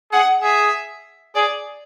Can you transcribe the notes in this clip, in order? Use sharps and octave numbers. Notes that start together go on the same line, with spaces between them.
G#4 F#5
G#4 E5
G#4 D5